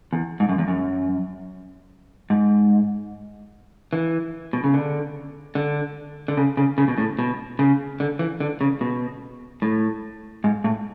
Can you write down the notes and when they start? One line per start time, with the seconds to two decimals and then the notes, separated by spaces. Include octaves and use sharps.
0.13 E2
0.40 G#2
0.49 F#2
0.58 E2
0.68 F#2
2.30 G#2
3.93 E3
4.53 B2
4.64 C#3
4.74 D3
5.55 D3
6.28 D3
6.37 C#3
6.57 C#3
6.78 C#3
6.88 B2
6.98 A2
7.19 B2
7.59 C#3
8.00 D3
8.19 E3
8.40 D3
8.61 C#3
8.81 B2
9.62 A2
10.44 G#2
10.64 A2